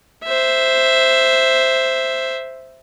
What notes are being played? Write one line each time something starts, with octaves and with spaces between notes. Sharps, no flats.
C5 E5